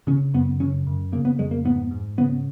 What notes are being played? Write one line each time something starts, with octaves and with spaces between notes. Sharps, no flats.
C#3 C#4
F#2 B3
C#3 C#4
F#2
C#3 A#3
B3
F2 G#3
A#3
G#2 B3
G#2
C#3 B3